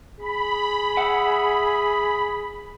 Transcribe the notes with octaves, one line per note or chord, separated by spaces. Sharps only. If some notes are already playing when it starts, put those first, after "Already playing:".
G#4 B5
E5 F#5